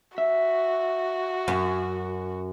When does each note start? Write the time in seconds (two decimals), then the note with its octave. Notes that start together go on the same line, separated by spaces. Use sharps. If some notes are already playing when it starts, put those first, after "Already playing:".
0.18 F#4 E5
1.48 F#2